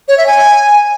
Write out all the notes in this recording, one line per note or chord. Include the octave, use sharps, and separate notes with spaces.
C#5
E5
G#5